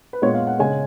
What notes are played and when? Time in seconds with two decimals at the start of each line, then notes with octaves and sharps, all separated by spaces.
0.13 B4
0.22 A#2 G#3 B3 F4 C#5
0.35 F5
0.47 F#5
0.59 C#3 G#3 C#4 G#5